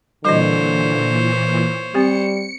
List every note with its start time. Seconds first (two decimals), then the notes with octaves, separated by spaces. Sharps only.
0.25 A#2 D3 E3 G3 F#4 C5 C#5 D#5
1.94 G3 C4 G4 C#7